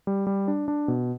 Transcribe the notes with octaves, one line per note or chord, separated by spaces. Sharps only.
G3
G3
D4
D4
B2